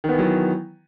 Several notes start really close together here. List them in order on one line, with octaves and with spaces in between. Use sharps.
D#3 B3 E3 F#3